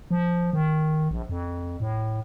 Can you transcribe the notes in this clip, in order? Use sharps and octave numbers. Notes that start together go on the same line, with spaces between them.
F3
D#3
A#1
F2
A2